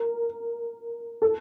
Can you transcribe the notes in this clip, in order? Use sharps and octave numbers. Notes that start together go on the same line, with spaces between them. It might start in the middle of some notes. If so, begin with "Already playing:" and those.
Already playing: A#4
A4